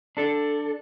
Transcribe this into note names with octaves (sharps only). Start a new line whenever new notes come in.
D4 A4